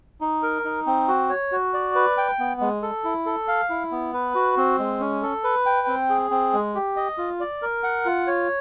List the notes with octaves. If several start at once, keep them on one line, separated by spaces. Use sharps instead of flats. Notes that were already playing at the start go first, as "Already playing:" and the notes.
D#4
A#4
D#4
C4
F#4
C#5
F#4
D5
B4
G5
B3
G#3
A4
E4
A4
F5
E4
B3
B4
F#4
C4
G#3
C#4
A4
B4
G5
C4
G#4
C4
G#3
G4
D#5
F4
D5
A#4
F#5
F4
C#5